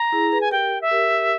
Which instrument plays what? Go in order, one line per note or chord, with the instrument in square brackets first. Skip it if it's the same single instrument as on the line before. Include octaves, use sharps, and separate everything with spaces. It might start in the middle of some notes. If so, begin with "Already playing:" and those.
Already playing: [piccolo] A#5
[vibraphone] E4 G#4
G#4 B4
[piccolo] G#5
[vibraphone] G4 A#4 [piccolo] G5
[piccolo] E5
[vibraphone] G4 A#4
G4 A#4